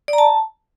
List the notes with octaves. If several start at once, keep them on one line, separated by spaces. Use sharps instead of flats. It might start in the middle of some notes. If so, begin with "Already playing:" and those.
D5
A#5
A5